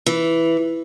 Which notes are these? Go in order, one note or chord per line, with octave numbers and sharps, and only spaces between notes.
E3